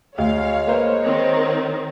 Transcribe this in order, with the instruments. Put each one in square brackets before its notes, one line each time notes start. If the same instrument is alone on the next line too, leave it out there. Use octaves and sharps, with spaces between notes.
[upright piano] D2 [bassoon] G#3 [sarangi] C#5 [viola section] F5
[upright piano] A#3 B4 C5
[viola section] D#3 C4